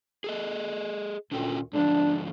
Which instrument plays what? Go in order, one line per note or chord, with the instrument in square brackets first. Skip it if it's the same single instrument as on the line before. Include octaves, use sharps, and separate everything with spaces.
[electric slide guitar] G#4 A4 D#5
[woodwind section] D2 A#2 D#3 [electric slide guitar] D3 C#4 G5
[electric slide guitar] G#2 D3 F3 [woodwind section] D4